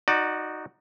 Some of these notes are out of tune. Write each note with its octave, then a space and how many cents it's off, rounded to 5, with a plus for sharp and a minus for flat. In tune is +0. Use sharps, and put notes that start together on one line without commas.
D#4 +0 F#4 +0 D5 +20